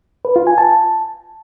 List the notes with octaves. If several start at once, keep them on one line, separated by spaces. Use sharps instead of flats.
B4
F4
G#5
A5